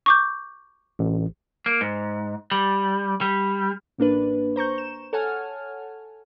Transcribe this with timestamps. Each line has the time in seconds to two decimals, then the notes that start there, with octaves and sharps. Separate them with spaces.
0.06 C#6 D6 G6
0.99 A1
1.66 A#3
1.81 G#2
2.51 G3
3.21 G3
3.98 A1 A#3 D4 B4
4.56 C5 A#5 C#6 G6
4.78 E7
5.13 A4 C#5 F#5 G#5 A5 F6